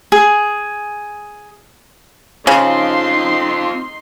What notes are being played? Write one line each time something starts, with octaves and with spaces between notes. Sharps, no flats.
G#4
C#3 C4 D#4 F4 C5 C6